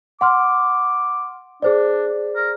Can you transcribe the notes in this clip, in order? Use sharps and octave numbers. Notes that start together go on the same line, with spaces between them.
F#5 C6 D6 F6
D4 G#4 C5 D5
A#4